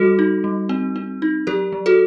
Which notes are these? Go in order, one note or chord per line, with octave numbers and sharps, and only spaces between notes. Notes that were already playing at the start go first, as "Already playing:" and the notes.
Already playing: G3 F#4 A4
D#4
G3
C4
C4
D#4
F#3 G4 A#4
F#3
F#4 A4